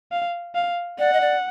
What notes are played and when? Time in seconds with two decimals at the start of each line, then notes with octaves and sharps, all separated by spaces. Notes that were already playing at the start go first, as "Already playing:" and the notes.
0.12 F5
0.55 F5
0.99 D5 F#5
1.13 D#5
1.21 D5